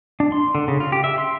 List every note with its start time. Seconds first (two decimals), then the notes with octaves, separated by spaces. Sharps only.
0.20 D4
0.32 C6
0.55 D3
0.68 C#3
0.80 F4
0.92 G4
1.04 E5
1.18 C6